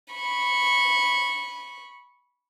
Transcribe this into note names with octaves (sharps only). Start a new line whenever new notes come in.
B5 C#6